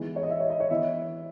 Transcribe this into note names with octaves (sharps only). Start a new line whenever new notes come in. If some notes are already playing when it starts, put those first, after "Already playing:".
Already playing: E3 G#3 B3 D#4
C#5
D#5
E5
C#5
D#5
C#5
E3 B3 E4 E5